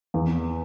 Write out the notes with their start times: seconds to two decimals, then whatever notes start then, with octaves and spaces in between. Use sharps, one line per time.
0.14 E2